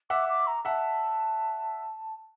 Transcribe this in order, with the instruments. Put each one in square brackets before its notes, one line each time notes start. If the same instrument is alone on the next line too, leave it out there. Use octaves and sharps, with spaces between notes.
[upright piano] E5 F#5 [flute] D6
[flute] D6
A#5
[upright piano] E5 F#5 [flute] A5